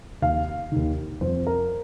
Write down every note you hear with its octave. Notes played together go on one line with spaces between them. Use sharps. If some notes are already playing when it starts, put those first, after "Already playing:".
D#2 D#3 F5
D#2 D#3
F2 F3 C5
A#4